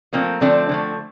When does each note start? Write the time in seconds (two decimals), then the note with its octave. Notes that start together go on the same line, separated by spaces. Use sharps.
0.13 D3 F3 A3 A#3 C4
0.41 D3 F3 A3 C4 D4
0.69 D3 F3 A3